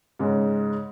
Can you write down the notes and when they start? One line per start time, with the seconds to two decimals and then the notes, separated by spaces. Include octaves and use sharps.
0.19 G#2 C#3 G#3